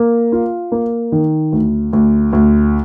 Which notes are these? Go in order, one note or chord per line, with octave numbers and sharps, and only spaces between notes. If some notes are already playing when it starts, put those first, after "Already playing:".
Already playing: A#3
F4
A#3
D#3
D2
D2
D2